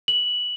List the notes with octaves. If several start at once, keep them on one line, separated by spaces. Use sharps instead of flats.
F#7